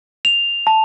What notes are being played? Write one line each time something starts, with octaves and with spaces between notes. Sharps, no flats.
F7
A5